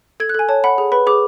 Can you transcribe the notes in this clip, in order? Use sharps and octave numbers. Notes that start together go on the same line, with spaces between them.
A4 G#6
F#6
A4 G#5
C#5 A5
F#5 B5
G#4
B4 B5
G#4 D6